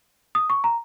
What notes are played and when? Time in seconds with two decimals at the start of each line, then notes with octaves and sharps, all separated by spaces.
0.35 D#6
0.50 C#6
0.64 A#5